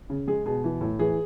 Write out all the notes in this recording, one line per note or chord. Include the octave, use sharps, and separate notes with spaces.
C#3
G#3 G#4
B2 G#4
E3
A2
E3 G#4